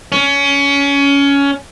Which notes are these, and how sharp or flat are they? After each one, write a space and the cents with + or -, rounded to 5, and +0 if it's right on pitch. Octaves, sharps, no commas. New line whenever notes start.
C#4 +20